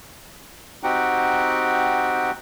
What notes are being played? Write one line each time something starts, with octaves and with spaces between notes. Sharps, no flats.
C4 D#4 F#4 G4 F#5 G5